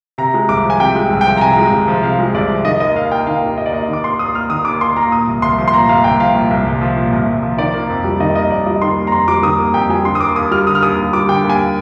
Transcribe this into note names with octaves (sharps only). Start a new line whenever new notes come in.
C3 A#5
G#3
C2 D6
F3
G#5
C3 G5
G#3
C2
G5
F3
A#5
C3 G#5
G#3
C2
F3
C3 F5
G#3
C2 D5
F3
D#3 D#5
D#2 D#5
D#2 F5
A#3 G5
D#3 F5
D#2
D#2 D#5
D5
A#3 D#5
D#3 D6
D#2 C6
D#2 D#6
A#3 F6
D#3 D#6
D#2 D6
D#2 C6
A#3 A#5
A#2 D#6
C2
C2 C6
F3
C6
A#2 A#5
C2 F5
C2 G5
F3 F5
A#2
C2
C2
F3
A#2
C2
C2
F3
D#3 D5
A#3
F2
G3
D#3 D#5
A#3 D#5
F2 D5
G3 D#5
D#3 C6
A#3
A#5
F2 C6
G3 D6
D#3 D#6
A#3 D#6
F2 G5
G3 G#5
D3 C6
D#6
D#2 D6
D#2 D#6
G3 F6
D3 D#6
F6
D#2 D#6
D#2
G3 D6
D3 G5
D#2
G#5